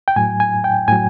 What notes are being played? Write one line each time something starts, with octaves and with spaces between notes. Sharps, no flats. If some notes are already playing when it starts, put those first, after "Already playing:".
G5
A2 F#3 G#5
G#5
G5
A2 F#3 G#5